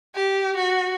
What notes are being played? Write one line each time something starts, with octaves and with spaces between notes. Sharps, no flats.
G4
F#4